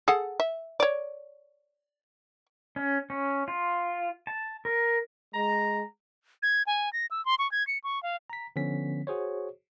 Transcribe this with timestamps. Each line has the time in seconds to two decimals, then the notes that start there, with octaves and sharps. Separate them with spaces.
0.08 G#4 A4 F#5
0.40 E5
0.80 C#5 D5
2.76 C#4
3.10 C#4
3.48 F4
4.27 A5
4.65 A#4
5.34 G#3 A#5
6.43 G#6
6.67 G#5
6.93 A#6
7.11 E6
7.26 C6
7.39 C#6
7.52 G#6
7.67 C#7
7.84 C#6
8.03 F5
8.30 A#5 B6
8.56 D3 F3 B3 C#4 B6
9.07 F#4 G#4 C5 C#5